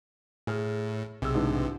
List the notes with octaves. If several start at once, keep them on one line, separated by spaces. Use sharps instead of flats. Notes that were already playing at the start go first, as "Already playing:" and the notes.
A2 G#4 F6
B1 C3 G#4 E6
A1 G#2 D3